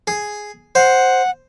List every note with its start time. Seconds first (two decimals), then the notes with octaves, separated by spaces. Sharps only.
0.07 G#4
0.75 C5 F#5